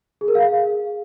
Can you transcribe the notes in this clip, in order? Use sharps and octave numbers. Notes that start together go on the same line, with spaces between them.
G#4
A#4
F5
G#4